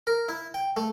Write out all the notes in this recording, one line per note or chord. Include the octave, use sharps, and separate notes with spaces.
A#4
E4
G5
A3